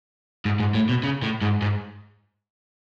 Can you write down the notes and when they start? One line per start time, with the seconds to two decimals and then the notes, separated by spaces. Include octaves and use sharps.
0.45 G#2
0.60 G#2
0.75 A2
0.89 B2
1.03 C#3
1.23 A2
1.42 G#2
1.62 G#2